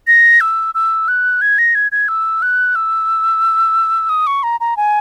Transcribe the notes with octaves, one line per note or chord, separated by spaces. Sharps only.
A#6
E6
E6
F#6
G#6
A#6
G#6
G#6
E6
F#6
E6
D#6
C#6
A#5
A#5
G#5